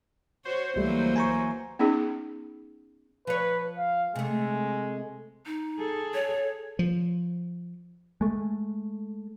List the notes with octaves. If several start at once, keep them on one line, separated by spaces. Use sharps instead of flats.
F#4 C5 C#5
C#2 E3 F#3 G3 A3 A#3
G#5 A#5 C#6
B3 C#4 D#4 G#4
F3 B4 C#5
F5
C3 G#3 A3
D#4
G#4 A4
C#5
F3
G#3 A3